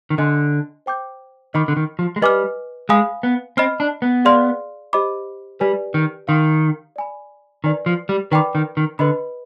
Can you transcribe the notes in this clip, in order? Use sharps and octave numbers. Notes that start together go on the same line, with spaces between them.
D#3
D3 D#5 G#5 C6 F6
C5 G5 D6 G6
D#3 D#5 B5 D6 F6
D3
D#3
F3
G#3
G3 B4 D#5 G#5 D6 F6
G#3 F5 G#5 B5 D#6
B3
C4 D#5 B5 F6
D4
B3
G#4 D5 F5 C6 F6
G4 C5 D#5 B5 D6
G3 G4 B4 D5 G#5
D#3
D#3 F5 C6 D#6
D5 G#5 B5
D#3 B4 D5 G#5
F3
G3
D#3 B4 D5 G5 B5 D6
D#3
D#3
D3 B4 D#5 B5